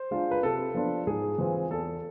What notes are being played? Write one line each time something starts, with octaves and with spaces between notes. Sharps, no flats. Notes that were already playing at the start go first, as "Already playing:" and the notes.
Already playing: C5
G#3 D4 F4
B4
C3 A4
F3 B3 D4 F4
G#2 G#4
E3 G#3 C4 F4
E2 A4